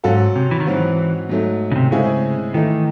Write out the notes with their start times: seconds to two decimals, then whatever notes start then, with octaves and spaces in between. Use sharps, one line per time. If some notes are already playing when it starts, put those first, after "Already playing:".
0.04 G#2 F#3 C#4 F#4 A4
0.36 C3
0.51 E3
0.60 D#3
0.66 G#2 E3 F#3 C4 F#4
1.29 G#2 F#3 A3
1.71 C#3
1.76 C3
1.91 A2 C#3 G#3 C4 E4 G#4
2.54 D#3 E3 A3 D#4